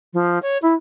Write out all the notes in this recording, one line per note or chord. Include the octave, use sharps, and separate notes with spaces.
F3
C#5
E4